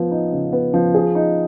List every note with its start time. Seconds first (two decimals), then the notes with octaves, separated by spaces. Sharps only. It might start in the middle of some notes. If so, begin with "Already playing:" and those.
Already playing: F3 B3
0.11 D#4
0.32 C#3
0.53 B3
0.74 F3
0.95 G#4
1.15 D#4